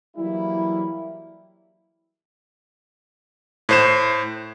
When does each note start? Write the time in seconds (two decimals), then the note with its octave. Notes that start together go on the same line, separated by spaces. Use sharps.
0.17 E3 F#3 G3 A#3 E4
3.69 A2 C5 E7